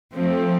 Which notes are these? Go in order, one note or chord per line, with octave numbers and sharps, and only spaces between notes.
F3 A3 C4